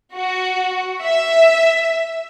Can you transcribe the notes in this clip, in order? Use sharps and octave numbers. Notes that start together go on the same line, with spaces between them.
F#4
E5